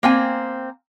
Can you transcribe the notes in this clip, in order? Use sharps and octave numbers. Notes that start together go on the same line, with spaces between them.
A#3 C4 G#5